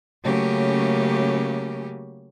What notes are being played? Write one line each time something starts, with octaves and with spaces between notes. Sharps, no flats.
C#3 F#3 A3 A#3 C#4 G4